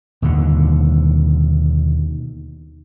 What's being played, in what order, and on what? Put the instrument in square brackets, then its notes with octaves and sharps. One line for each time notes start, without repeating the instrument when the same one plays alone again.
[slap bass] D#2 B2 D3